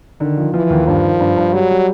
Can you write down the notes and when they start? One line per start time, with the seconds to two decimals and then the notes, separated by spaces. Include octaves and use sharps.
0.20 D3 D#3
0.37 F3
0.54 E3 F3
0.70 D#2
0.86 G2 F3
1.03 D#3
1.20 G2
1.37 G2
1.54 F#3 G3
1.71 G3